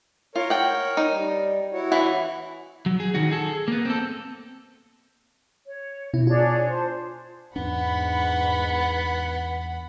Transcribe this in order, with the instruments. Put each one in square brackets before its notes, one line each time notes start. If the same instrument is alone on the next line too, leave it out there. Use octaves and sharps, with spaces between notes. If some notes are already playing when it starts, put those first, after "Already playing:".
[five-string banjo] F4 [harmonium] A#4 C#5
[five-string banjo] F#5 G5
D#4
[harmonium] G3
E4 F#4 C#5
[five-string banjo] E3 F#5
[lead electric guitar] F#3
G#4
D#3 F#4
G#4 A4
A#3 B3
C4 A4
[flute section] C#5
[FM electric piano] B2 E4
[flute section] D4 G#4 C#5 [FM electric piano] F4
[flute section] C5 A5
[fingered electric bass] E2 D4 [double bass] G#2 [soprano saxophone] B3 [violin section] F#5 B5